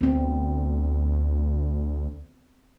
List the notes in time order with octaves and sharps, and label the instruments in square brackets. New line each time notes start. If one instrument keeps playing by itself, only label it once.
[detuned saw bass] D2 [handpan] B3 C4